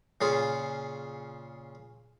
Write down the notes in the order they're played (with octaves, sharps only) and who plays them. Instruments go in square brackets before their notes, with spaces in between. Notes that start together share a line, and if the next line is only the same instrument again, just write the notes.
[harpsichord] A#2 C#3 F4 G#4